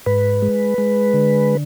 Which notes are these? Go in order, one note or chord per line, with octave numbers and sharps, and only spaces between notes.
G#2 B4
G#3
G#3
D3